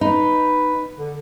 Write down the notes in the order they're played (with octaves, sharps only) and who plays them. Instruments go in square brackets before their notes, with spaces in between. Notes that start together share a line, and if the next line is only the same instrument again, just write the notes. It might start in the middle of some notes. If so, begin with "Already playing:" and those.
[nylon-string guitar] D#4 [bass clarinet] B4
[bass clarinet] D3